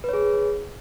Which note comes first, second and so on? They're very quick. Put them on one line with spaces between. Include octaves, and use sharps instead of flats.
B4 C#5 G#4